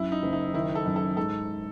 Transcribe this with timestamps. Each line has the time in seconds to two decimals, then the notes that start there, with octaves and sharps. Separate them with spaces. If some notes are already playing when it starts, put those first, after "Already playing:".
Already playing: F#2 E4
0.12 D#4
0.23 F#1
0.33 D#4
0.54 D#3 E4
0.75 A4
0.86 F#2
0.96 A4
1.17 G#2 A4